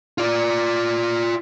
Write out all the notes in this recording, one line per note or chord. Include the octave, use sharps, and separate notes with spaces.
F4 D5